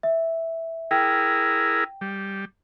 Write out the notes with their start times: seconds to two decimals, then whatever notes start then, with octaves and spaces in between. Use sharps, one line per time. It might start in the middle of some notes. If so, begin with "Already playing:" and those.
0.03 E5
0.91 E4 G#4 A#4 G5
2.01 G3